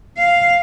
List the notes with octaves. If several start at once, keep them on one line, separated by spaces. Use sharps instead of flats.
F5